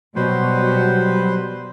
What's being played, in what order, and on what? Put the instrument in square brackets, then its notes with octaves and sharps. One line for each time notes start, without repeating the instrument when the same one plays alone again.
[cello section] B2 [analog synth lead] F#3 [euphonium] G3 [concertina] B4 C5